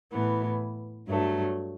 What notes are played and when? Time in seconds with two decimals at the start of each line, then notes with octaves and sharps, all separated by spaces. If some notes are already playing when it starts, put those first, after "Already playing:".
0.12 A2 E3 B3
1.08 G2 F#3 A3